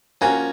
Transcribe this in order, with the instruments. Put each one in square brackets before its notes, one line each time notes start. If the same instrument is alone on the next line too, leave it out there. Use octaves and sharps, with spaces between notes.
[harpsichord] F3 A#3 C#4 F#4 [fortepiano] G#5